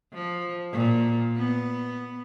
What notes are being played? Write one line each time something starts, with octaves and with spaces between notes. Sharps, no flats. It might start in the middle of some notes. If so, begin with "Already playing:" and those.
F3
A#2
B3